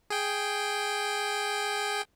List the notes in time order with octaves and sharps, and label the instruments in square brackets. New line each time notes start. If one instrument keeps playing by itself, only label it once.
[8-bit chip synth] G#4 G5